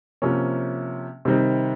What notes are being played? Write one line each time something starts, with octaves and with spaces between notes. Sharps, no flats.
C3 F3 A#3 C#4
C3 D#3 G3 C4 D#4